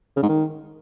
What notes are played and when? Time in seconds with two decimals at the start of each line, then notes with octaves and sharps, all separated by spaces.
0.17 C#3
0.23 G#2
0.29 D#3